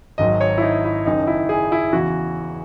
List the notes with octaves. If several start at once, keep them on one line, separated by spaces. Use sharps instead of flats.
G#1 G#2 D#3 F#3 D#5
C#5
E4
D#4
E4
F#1 F#2 D#3 D#4
E4
G#4
E4
E2 C#3 E3 F#4